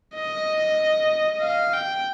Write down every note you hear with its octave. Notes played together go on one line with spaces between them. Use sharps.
D#5
F5
G5